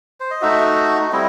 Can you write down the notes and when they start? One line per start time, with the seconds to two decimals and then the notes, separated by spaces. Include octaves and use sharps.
0.20 C5
0.31 D#5
0.41 A3 D#4 F#4 E5
1.12 G3 C4 E4 D#5